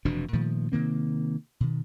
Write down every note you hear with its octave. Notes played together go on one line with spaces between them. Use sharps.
F1 B2 E3 D4
A#2 D#3 F3 A3
C3 D#3 A#3 C4
B2 D#3